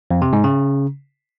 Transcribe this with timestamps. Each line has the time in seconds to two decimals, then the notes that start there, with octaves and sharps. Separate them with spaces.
0.11 F2
0.22 C3
0.33 G#2
0.44 C#3